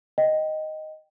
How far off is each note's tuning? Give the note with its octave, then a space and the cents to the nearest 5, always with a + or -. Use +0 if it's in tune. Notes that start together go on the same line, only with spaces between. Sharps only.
D#5 +0 G5 -10